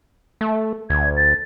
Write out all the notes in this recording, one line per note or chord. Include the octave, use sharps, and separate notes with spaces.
A3
D2 G#6
A6